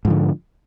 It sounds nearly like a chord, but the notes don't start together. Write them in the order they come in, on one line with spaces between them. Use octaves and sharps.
G#2 F3 D3